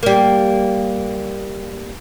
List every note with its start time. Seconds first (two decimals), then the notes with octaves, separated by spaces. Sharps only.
0.03 G3 A#3